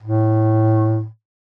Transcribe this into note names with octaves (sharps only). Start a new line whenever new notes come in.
A2